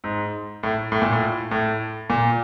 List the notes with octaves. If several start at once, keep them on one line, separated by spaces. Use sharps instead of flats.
G#2
A2
A2
A#2
A2
A2
A#2